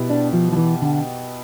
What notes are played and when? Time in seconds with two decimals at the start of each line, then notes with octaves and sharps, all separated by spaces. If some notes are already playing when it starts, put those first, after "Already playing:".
Already playing: B2 B3 E4 G4
0.10 D4
0.33 F3
0.52 F3
0.57 E3
0.82 D3